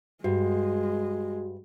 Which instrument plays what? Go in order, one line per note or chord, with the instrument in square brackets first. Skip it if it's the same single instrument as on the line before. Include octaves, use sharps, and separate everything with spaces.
[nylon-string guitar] G2 [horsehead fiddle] G#3 [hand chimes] F#4